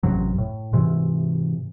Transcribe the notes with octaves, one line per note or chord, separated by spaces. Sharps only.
A1 F#2 C3 F#3
A2
G#2 C3 E3